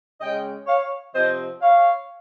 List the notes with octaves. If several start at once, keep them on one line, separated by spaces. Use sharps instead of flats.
C#3 G#3 C#4 D#5 G5
C#5 F5
C3 F3 C4 C5 D#5
C#5 F5